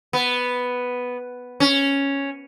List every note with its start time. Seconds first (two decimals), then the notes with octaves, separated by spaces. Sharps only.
0.13 B3
1.60 C#4